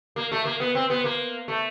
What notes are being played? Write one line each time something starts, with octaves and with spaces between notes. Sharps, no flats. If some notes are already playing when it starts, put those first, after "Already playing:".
A#3
A3
A#3
B3
C4
B3
A#3
A3